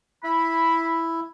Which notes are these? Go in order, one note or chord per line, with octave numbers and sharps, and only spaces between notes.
E4 B5